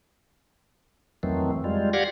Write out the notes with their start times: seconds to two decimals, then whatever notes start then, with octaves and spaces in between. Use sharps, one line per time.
1.23 F2 D#3 E3 F#3 A3 C4
1.64 G3 G#3 F4
1.93 G4 D5 F5 F#5 G#6 A#6